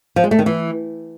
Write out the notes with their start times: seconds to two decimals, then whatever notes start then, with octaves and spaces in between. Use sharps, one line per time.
0.16 F3
0.24 G#3
0.31 A3
0.39 D#3
0.46 E3